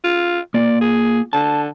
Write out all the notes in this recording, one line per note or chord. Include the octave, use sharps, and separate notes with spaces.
F4
A#3 F4 D5
G#4
D3 A5